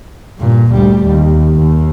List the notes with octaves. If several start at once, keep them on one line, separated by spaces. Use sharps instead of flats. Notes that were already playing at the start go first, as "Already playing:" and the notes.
G2 A#2
D2 G3
D#2
D#2